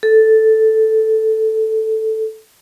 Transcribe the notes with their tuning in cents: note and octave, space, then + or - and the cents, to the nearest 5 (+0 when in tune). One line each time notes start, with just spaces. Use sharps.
A4 +0